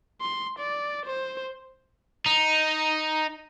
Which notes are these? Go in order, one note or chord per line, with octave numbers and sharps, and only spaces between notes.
C6
D5
C5
D#4